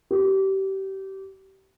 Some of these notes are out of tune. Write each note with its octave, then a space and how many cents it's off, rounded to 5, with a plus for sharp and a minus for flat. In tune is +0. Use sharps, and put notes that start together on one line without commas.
G4 -25